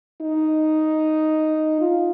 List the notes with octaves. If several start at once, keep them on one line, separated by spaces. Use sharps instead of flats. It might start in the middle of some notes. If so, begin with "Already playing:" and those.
D#4
F4